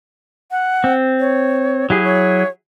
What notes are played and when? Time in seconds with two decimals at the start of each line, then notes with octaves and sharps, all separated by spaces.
0.51 F#5
0.84 C4
1.20 C#5
1.90 F#3 E4 G4 G#4
2.04 C#5